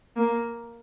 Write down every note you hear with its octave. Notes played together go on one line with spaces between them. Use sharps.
A#3